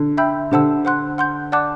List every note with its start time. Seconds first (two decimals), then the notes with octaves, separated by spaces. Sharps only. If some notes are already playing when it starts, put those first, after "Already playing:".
Already playing: D3
0.17 E5 G5 B5 E6 G6
0.51 D3 G4 C5 F#5 A5 E6
0.85 C5 F#5 C6 F#6
1.18 F#5 C6 G6
1.52 D5 F#5 A5 D6 F#6